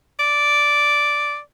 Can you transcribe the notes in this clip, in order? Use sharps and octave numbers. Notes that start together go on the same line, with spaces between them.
D5